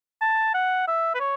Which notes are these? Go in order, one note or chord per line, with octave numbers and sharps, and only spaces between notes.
A5
F#5
E5
B4
C#5